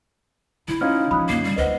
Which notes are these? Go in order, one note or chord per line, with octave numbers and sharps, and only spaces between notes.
D3 E4
C#4 D#4 F4 F6 G#6
E3 F3 B5 D#6 F#6
F#2 D3 A#3 C7
G3
D2 B4 C5 D#5 F#5